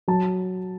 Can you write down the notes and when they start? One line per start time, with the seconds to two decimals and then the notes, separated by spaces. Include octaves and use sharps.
0.08 F#3 A5